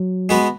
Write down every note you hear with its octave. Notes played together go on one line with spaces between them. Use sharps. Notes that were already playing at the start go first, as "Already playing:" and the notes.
Already playing: F#3
G#3 B3 F#4 B4